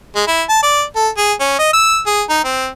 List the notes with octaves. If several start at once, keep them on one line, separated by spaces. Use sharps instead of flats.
G#3
E4
A5
D5
A4
G#4
C#4
D#5
E6
G#4
D#4
C4